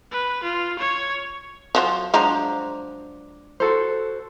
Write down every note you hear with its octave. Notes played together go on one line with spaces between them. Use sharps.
B4
F4
C#5
F3 F#3 C5
F3 F#3 G#3 D4 C5 A#5
F#4 A4 C5